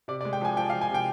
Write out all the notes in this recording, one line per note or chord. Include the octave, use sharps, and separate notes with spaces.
C3 D5
D5
G#3
G5
F3 G#5
F3 G5
F5
F3
G#5
C3 G5